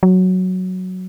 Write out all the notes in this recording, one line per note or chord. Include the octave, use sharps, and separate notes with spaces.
F#3